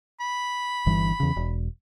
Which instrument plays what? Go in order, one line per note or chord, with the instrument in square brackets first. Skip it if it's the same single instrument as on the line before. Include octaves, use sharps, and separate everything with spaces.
[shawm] B5
[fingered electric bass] G1 G2 E3
E2 C#3
E1